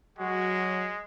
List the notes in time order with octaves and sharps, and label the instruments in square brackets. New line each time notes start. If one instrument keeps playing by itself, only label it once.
[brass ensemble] F#3 F#4 [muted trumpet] G#3